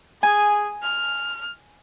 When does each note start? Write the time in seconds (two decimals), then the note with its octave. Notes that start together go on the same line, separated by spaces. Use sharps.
0.23 G#4 G#5
0.83 F6